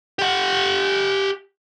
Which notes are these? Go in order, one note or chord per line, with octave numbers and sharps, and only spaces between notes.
G4 F#5